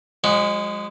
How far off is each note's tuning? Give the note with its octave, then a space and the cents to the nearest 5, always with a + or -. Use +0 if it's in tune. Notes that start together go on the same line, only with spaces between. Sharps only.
F3 +40 G#3 -20 F#4 +0